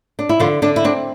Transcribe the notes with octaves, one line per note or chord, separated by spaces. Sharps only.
D4
E4
D3 F3 F4
D3 D4
E4
C4 D4